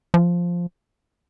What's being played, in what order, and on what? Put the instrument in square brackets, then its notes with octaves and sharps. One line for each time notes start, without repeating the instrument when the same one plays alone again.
[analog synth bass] F3